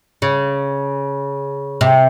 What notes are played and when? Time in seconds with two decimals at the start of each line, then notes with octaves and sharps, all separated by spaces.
0.22 C#3
1.81 C3